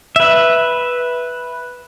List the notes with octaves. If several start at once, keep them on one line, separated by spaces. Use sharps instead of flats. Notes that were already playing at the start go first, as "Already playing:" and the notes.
B4 E5